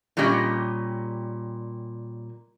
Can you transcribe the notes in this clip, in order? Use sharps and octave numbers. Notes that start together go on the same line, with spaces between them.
A#2 G3 C#4 G4 D#5